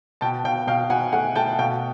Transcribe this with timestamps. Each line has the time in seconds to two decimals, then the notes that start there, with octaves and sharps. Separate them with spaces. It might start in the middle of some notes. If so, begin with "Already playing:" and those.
0.21 B2 G5 A5
0.44 B2 F5 G5
0.67 B2 F5 G5
0.90 B2 F#5 G#5
1.13 A3 F#5 G#5
1.35 A3 G5 A5
1.59 B2 F5 G5